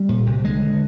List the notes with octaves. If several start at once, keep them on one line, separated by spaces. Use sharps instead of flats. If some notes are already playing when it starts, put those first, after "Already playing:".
Already playing: G3
A#2
C2
D3 G#3
D3